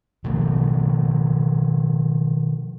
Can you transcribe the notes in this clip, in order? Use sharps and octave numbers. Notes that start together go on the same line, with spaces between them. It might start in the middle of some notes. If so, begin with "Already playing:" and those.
B2 D#3 F3 A3